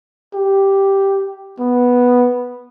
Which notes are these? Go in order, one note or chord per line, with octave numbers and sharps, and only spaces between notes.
G4
B3